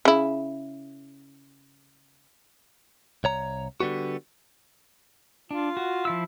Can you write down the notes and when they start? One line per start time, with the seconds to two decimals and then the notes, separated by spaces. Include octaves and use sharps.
0.05 C#3 E4
3.24 C2 C#5 A#5
3.80 D3 G3 B3 F#4
5.51 D4 F4
5.77 F#4
6.05 F3 E4 E6